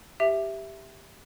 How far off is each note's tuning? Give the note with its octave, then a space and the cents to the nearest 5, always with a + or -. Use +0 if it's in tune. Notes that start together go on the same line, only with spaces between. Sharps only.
G4 +0 E5 +0